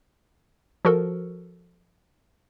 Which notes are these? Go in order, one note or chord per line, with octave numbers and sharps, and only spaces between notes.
F3 F#4 A4 A#4